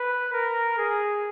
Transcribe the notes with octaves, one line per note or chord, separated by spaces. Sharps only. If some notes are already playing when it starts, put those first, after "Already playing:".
Already playing: B4
A#4
G#4